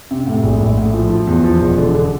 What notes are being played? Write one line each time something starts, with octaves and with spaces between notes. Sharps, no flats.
C3
A2
A#1
A#1
A2
F3
F3
E2
F3
E1
D3
D3